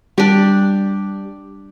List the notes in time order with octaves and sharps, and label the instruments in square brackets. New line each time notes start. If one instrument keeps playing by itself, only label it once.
[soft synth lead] G3 [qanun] D4 G4